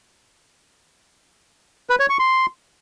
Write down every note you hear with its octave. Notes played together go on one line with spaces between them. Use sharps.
B4
C#5
C#6
C6